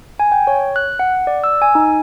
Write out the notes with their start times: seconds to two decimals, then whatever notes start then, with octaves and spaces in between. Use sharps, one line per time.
0.20 G#5
0.32 G5
0.47 C#5
0.76 F#6
0.99 F#5
1.27 D5
1.44 E6
1.62 G#5
1.75 D#4